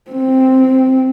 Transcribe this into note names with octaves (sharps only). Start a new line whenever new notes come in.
C4